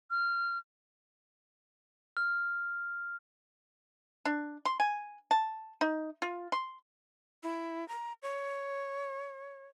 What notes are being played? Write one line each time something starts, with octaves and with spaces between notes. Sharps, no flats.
F6
F6
D4
C6
G#5
A5
D#4
F4
C6
E4
A#5
C#5